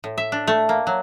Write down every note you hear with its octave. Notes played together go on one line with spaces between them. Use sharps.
A2
E5
D4
A3
A#3
F#3